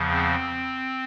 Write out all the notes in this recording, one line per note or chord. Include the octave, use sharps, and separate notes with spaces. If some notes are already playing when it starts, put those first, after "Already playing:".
Already playing: E2 C#3 F3
C4